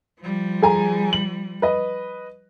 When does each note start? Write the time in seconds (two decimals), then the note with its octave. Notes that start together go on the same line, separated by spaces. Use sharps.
0.20 F3 G3
0.62 G#4 G#5 A#5
1.13 F#7
1.62 B4 D#5